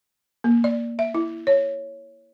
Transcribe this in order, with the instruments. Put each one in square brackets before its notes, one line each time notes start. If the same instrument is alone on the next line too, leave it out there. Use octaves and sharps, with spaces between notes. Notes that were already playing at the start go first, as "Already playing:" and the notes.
[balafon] A#3
D5
E5
E4
C#5